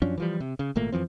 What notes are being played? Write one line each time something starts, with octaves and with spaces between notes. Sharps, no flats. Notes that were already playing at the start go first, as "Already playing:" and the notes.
F#2 F3 C#4 D4
E3 F3 G3
C3
C#3
G#1 A#2 A3 A#3
F2 E3 F3 C4